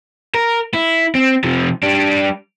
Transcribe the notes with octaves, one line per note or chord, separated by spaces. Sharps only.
A#4
E4
C4
C3 F3
G3 D4